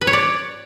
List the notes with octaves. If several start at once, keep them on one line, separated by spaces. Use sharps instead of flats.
B4
C#5
D5